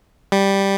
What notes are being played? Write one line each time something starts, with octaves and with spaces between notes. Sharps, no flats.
G3